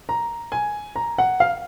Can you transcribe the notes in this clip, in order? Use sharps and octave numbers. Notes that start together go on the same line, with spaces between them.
A#5
G#5
A#5
F#5
F5